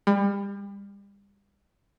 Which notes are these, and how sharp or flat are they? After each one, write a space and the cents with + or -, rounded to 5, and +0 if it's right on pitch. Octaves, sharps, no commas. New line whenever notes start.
G3 +35